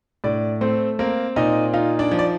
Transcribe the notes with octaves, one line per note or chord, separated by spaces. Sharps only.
A2 D4 D5
A3 C4 C5
A#3 C4 A#4
A#2 D#4 D#5
D#4 F4 F5
D4 D5
F3
D5